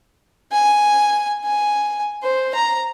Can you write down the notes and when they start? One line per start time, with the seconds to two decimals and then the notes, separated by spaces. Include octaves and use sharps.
0.52 G#5
1.45 G#5
2.23 C5
2.55 A#5